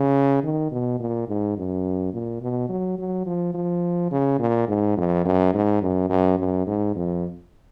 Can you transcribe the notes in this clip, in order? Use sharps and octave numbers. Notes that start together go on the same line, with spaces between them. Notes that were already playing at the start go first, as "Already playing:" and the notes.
Already playing: C#3
D#3
B2
A#2
G#2
F#2
A#2
B2
F#3
F#3
F3
F3
C#3
A#2
G#2
F2
F#2
G#2
F#2
F#2
F#2
G#2
F2